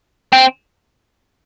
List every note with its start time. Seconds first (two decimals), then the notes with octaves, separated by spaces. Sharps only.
0.33 C4